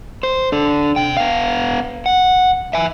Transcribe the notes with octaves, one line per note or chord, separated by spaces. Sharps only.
C5
D4 A4
C3 G5
B3 F5
F#5
E5 G#5